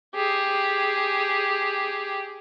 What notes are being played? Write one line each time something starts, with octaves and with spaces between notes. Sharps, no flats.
G4 G#4